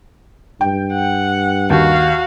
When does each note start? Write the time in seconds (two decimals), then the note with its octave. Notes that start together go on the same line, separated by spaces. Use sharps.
0.61 G2 G5
0.93 F#5
1.70 D#2 F#4 F5